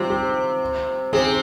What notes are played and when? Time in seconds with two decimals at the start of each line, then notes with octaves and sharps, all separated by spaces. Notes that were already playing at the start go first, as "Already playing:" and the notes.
Already playing: C3 G3 C4 F4
0.10 G4
1.13 C3 C4 G#4